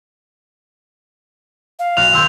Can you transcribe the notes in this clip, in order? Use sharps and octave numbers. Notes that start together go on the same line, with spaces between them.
F5
B1 F6 F#6 F7
D#2 C6 E6 G6